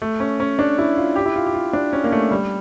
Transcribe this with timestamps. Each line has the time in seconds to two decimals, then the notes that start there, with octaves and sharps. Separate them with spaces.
0.02 A3
0.20 C#4
0.40 C#4
0.59 D4
0.78 E4
0.97 F4
1.16 G4
1.26 E4
1.36 F4
1.46 G4
1.54 F4
1.73 D4
1.93 C#4
2.04 A#3
2.12 A3
2.31 G3